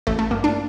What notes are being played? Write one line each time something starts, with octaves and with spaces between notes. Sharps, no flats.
A1 A3
A3
G2 A#3
D4